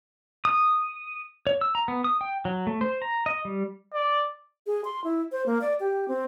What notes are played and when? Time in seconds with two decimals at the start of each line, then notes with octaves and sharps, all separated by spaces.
0.45 D#6
1.47 C#5
1.61 E6
1.75 A#5
1.88 B3
2.04 D#6
2.21 G5
2.45 F#3
2.67 A3
2.81 C5
3.02 A#5
3.26 D#5
3.45 G3
3.94 D5
4.67 G#4
4.85 C6
5.04 E4
5.32 C5
5.46 A#3
5.61 D5
5.80 G4
6.08 C4